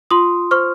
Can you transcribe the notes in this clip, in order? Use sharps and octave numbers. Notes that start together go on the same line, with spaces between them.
F4 C6 D#6
C5 C#6 F6